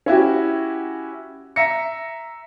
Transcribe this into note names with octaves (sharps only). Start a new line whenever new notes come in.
C#4 E4 F#4 G4
E5 A#5 A#6 C#7